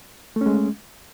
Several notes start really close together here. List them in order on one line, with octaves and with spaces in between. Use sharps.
A3 C#4 G#3